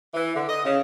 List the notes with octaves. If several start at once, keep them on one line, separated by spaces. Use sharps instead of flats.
E3
D3
D#5
C#3